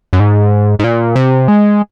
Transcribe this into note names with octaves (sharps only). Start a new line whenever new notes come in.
F#2
G#2
G#2
A#2
C3
G#3